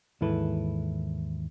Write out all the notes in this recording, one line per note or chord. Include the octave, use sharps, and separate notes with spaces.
D#2 G#2 E3 E4 A4 B4